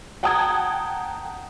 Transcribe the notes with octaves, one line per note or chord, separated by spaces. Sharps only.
F#5 G5 A5 A#5 D#6 G#6